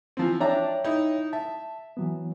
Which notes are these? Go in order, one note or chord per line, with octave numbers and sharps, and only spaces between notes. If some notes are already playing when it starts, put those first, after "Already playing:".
E3 F3 C4
D4 C#5 E5 G5 A#5
D#4 E4
E5 A5
E3 F#3 B3